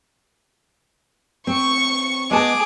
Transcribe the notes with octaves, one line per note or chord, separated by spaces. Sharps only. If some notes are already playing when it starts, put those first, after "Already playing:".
C4 C#6
G#3 B3 G#4 A5 D6